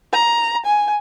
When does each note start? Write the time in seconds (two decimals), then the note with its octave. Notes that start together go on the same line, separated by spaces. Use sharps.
0.13 A#5
0.66 G#5